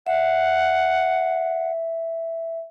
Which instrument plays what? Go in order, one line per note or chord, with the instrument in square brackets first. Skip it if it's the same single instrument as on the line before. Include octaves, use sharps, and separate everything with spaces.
[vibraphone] E5 [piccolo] F#5